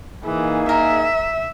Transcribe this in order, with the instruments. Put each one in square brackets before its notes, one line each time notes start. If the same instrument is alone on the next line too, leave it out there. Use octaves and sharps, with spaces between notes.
[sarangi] E3 [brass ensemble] A#3 D#4 G#4
[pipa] A#4 [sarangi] E5